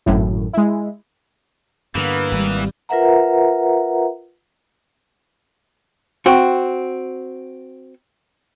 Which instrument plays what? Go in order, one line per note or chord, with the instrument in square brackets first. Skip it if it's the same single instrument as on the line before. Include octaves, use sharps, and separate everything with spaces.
[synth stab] G#1 F#2 A2
G#3 E4
[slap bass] G2 D3 [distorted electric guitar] E3 [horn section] A#3 B3 F5
[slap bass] G#1 [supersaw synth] G3
[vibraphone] F4 A#4 B4 E5 F#5 A#5
[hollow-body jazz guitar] C4 F#4